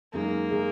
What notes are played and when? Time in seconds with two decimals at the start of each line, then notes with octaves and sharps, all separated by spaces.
0.13 F#2 D#3 G#3 A#3 D#4 G#4
0.50 D#3 G#3 D#4 G#4